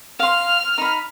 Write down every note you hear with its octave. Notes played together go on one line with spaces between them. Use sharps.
F5 C6 F6
D#4 B5